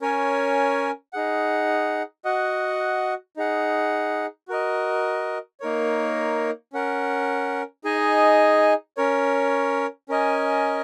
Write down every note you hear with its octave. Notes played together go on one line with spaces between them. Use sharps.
C#4 A#4 C#5 G#5
D#4 G#4 F#5
F#4 D#5 F#5
D#4 G#4 F#5
F#4 A#4 D#5
A#3 D#4 A#4 C#5
C#4 A#4 F#5
D#4 G#4 D#5 G#5
C#4 A#4 C#5
C#4 A#4 D#5 G#5